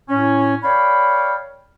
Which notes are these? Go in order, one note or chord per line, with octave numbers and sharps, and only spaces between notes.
A2 C#4
A#4 C#5 D5 F5 G5 B5